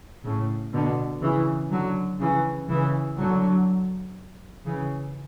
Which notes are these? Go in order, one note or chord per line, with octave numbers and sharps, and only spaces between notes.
A2 C#3
B2 D3
C#3 E3
D3 F#3
C#3 E3
C#3 E3
D3 F#3
C#3 E3